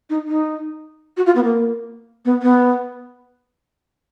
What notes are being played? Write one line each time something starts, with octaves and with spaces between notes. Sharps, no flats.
D#4
D#4
F#4
F4
B3
A#3
B3
B3